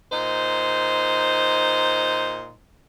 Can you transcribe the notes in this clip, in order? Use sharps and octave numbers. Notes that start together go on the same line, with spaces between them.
A#2 D#4 C5